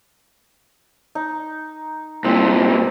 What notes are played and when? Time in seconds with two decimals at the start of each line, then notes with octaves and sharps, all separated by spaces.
1.15 D#4
2.24 C2 A#2 C4